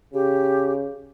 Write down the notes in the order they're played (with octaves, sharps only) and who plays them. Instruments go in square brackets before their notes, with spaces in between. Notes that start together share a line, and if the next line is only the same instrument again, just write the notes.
[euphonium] C#3 [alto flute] G4